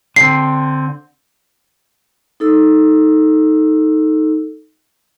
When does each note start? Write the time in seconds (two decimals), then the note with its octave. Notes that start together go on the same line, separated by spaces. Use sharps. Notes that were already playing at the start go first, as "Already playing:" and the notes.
0.16 D3 C4 C7
2.40 D#4 A4 E6